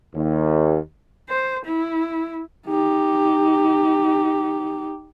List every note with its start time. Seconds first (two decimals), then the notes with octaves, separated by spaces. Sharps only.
0.14 D#2
1.29 C5
1.65 E4
2.68 D#4 G4